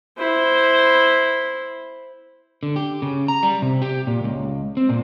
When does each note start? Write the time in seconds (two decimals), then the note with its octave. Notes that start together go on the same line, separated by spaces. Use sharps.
0.18 E4 C5
2.63 D3
2.76 G4
3.02 C#3
3.28 A#5
3.43 G3
3.62 C3
3.82 G4
4.07 A#2
4.24 C#2
4.77 C4
4.89 A#2